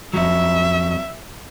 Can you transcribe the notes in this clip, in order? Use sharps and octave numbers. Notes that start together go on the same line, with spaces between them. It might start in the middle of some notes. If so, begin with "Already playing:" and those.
F2 F#3 E5